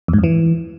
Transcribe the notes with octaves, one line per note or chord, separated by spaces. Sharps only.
E2
G#2
F2
E3